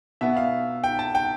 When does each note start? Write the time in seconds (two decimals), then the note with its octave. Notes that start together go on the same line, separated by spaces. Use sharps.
0.21 B2 B3 E5
0.37 F5
0.84 G5
0.99 A5
1.15 G5